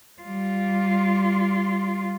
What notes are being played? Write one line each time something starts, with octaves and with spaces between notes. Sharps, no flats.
G3 F4